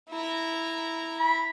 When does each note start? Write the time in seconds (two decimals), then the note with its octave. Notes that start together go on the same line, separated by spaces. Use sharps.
0.10 E4 A#5
1.19 B5